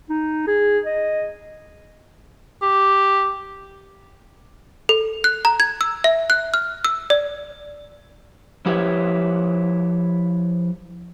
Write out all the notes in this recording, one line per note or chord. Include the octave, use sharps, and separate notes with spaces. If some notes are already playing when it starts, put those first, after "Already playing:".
D#4
G#4
D#5
G4
A4
F#6
A#5
G#6
E6
E5
F#6
F6
E6
D5
F3 E4 G4 B4 C#5 E5